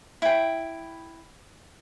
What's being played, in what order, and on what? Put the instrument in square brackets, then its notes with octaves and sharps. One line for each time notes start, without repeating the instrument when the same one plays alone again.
[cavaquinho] E4 G5